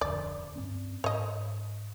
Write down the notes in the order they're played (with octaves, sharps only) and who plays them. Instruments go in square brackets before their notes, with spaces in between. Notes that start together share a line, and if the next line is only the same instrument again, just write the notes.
[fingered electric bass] D1 F2 D3 [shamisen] D5
[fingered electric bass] G2 C4 C#4
[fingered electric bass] G#2 [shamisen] C#5 D#5